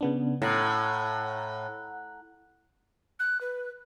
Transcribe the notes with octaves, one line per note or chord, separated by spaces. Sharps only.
C#3 B3 D4
A2 F#5 A#5 F#6
F#6
B4